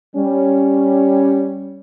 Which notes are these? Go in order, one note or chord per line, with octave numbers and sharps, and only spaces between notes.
G3 C#4